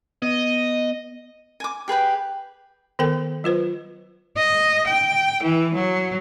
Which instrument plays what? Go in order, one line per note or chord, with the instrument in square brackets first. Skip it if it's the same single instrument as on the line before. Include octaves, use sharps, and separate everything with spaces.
[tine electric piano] B3 [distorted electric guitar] D#5
[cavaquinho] G#5 D6
G4 G#4 B4 G5
[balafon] D#3 B3 A4 A#4 G5
F#3 F4 B4 C5
[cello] D#5
G5
E3
F#3